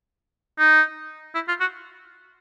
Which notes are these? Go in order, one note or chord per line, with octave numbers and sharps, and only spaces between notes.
D#4
E4
F4
F#4